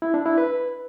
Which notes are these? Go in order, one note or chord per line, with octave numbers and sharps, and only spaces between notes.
E4
D4
E4
B4